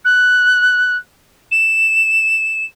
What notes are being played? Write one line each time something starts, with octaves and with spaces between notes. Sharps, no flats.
F#6
E7